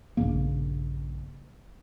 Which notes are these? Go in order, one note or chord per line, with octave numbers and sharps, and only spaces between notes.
A#1 G2 C#3 A#3